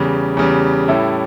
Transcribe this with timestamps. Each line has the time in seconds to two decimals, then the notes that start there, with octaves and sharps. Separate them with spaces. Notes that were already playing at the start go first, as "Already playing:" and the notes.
Already playing: E2 C#3 G3
0.37 E2 C#3 G3
0.88 A2 G3 C#4 E4 A4